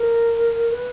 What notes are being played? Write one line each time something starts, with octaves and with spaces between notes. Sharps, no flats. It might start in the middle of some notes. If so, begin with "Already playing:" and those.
Already playing: A#4
B4